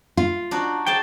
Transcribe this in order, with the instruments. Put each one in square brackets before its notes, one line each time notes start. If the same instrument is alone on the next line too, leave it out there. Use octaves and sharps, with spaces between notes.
[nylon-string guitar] F4
[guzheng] D4 D#4 F#4
[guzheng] G#4 D5 A5 [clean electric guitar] G5